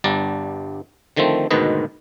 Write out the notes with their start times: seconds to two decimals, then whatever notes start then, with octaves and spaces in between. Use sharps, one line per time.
0.04 G1 G2 G3 D4 A5 A#5
1.17 D3 D#3 F3 A3 C4
1.51 D2 G#2 B2 D#3 B4 D#5